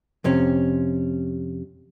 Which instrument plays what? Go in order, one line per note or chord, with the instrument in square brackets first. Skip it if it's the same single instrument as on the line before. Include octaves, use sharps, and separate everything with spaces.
[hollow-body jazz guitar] F2 C3 C#4